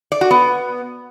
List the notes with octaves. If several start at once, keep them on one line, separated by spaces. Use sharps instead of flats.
D5
F#4
B3